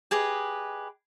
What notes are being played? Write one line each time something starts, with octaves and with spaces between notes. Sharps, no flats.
G4 G#4 B4 D#5